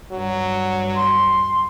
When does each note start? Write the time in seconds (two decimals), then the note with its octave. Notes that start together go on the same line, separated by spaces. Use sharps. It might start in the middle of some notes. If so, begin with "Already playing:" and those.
0.12 G2 F#3
0.96 C6